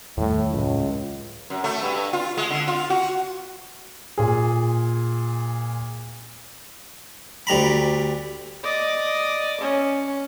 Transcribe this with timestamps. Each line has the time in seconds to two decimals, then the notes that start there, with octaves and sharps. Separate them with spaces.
0.17 E2 A2 D#3 G3
0.52 C#2 A2 F#3
1.50 F#2
1.64 A3
1.82 G2
2.13 F4
2.37 G#3
2.50 D3
2.68 F4
2.90 F#4
4.18 A#2 G#4
7.47 D2 G3 A#5 B5
8.63 D5 D#5
9.60 C#4